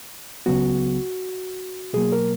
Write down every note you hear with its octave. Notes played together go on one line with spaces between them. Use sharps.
C#2 C#3 F#3 B3 F#4
B2 F#3 A#3 G#4
A#4